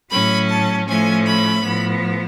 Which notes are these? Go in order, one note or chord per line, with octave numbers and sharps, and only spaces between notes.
A2 F#3 C#4 B5
A5
A2 F3 A3 C#4 G#5
B5
A2 F3 B3